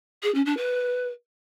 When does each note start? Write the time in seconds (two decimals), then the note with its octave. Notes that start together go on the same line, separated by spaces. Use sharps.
0.23 G#4
0.34 C#4
0.46 D4
0.57 B4